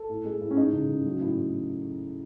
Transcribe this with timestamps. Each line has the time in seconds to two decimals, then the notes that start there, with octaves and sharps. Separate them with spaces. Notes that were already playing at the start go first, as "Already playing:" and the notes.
Already playing: A4
0.09 A2
0.25 G#3
0.41 A2
0.51 C#4
0.57 G#3 D#4
0.73 C#3
0.89 C#3
1.06 F#3
1.21 A2
1.38 A2